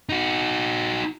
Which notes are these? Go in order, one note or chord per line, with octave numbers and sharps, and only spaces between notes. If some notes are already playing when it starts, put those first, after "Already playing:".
D#4 F#4